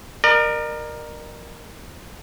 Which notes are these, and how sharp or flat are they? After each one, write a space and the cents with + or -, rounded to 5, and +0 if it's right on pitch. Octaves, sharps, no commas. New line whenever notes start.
A#4 +5 D5 +45